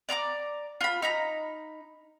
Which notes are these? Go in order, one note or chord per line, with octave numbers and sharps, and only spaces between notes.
D5 A#5 C6 D6
F4 B5
D#4 A#5 B5